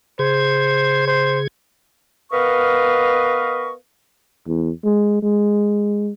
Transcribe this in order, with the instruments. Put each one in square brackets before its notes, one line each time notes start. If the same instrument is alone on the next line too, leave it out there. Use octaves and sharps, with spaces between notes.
[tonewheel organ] C#3 G#4 [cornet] C5
[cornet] C5
[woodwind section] B3 A#4 B4 D#5 F5 C#6
[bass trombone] E2
G#3
G#3